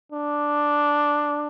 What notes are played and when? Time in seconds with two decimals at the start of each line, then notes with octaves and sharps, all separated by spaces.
0.12 D4